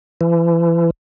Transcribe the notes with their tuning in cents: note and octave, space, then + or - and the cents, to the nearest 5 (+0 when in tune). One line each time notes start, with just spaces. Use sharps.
E3 +35